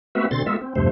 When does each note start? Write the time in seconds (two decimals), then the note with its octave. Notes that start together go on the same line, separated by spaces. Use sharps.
0.15 A3 B3 C4 F#4 B4 E5
0.31 B2 D3 C4 C6 A6
0.46 G#3 A#3 B3 F4 A4 E5
0.61 C4
0.75 E2 G2 C3 F3 A3 C5